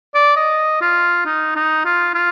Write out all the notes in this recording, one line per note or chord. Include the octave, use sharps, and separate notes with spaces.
D5
D#5
F4
D#4
D#4
F4
F4